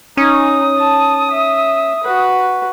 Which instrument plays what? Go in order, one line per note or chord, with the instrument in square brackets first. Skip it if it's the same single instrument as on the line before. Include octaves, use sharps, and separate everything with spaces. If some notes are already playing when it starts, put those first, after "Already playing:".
[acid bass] C#4 [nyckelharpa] D#4 [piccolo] D#6
[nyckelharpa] A5
E5
F#4 B4